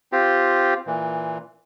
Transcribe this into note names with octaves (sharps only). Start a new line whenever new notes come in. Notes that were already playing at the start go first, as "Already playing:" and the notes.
C4 F4 G4
A#2 E3